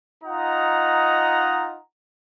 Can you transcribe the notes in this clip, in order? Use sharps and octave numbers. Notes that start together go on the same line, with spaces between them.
D#4 F4 D#5 F#5 A#5